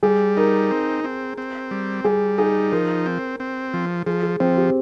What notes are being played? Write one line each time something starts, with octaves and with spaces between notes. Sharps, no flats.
G3 G#4
D#4 A#4
C4
C4
C4
G3
G3 G#4
D#4 G#4
F3 A#4
C4
C4
F3
F3 G#4
G#4
F3 C4
G4